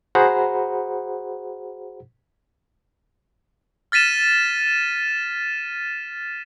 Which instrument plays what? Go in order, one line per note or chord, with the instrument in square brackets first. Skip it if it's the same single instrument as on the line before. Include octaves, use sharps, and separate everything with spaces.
[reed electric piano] F#4 G#4 C5 F#5 A#5 B5
[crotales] F6 A6 B6 D#7 E7